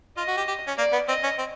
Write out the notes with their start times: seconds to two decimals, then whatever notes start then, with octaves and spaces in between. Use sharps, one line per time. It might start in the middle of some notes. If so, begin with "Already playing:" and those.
0.17 F4 D#5
0.28 F#4
0.37 G4
0.48 G4
0.68 C#4
0.78 A#3 D5
0.93 B3
1.08 C4 D#5
1.23 C#4
1.39 C4